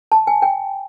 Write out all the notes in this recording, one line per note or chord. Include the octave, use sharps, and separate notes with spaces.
A5
G#5
G5